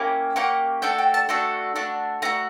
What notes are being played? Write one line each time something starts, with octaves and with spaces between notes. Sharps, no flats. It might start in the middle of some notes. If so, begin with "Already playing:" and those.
Already playing: A#3 C#4 E4 G4
A#3 C#4 G4 F#5
A3 D4 F#4 A4 G5
G5
A5
A3 D4 F#4 A4
A3 D4 F#4
A3 D4 F#4 A#5